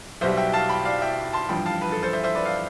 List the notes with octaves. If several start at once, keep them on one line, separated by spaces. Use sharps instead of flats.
B1 B2 G3 C5 E5
E5 G5
F5 A5
G5 B5
D5 F5
E5 G5
A5 C6
A1 G2 F3 G5 B5
F5 A5
B4
A4
A4 C5
C5 E5
C5 E5
B4 D5
D5 F5